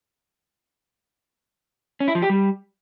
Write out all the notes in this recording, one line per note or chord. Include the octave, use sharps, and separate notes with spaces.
C#4
E4
F3
G4
G3